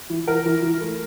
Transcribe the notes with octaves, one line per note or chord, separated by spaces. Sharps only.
E3
E3 A#4
E3
E3
A3